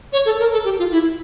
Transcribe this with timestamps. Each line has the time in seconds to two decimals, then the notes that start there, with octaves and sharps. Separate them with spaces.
0.13 C#5
0.25 A4
0.40 A#4
0.53 A4
0.65 G4
0.79 F4
0.92 E4